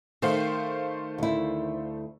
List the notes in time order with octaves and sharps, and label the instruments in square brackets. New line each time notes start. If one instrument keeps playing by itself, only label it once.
[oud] D#3 [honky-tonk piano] A3 C5 F5
[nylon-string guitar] D2 E4